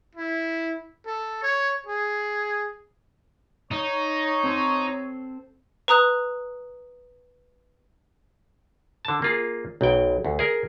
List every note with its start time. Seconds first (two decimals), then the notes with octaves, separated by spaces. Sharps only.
0.15 E4
1.07 A4
1.43 C#5
1.87 G#4
3.71 D#4 C#5
4.43 C4 A4 C5
5.88 B4 A#5 D#6 F#6
9.05 D3 A5
9.22 A#3 F4 G#4
9.81 B1 G5
10.25 D2
10.39 G#4 A#4